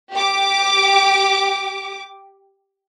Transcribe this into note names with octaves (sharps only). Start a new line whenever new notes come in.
G4 D6